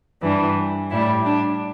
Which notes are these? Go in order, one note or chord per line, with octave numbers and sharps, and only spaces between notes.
G2 E3 G3 D4
A2 G3 E4
D4